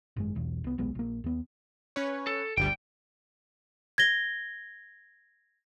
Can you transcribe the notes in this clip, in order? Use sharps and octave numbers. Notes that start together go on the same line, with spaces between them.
G#1 F#2 G#3
E1 B1 E2
C2 B3
D#1 B1 G#3 B3
A#1 A#3
D#2 B3
C#4 B4 C#5
A4
G1 D2 G3 G5
G#6 A#6 G7